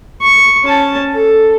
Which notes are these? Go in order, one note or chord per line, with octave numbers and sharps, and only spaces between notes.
C#6
C#4 A5
A4